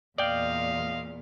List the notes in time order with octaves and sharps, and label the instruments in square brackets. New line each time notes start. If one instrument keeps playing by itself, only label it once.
[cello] E2 A#2 [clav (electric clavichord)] D5 G5 [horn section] D#5 F5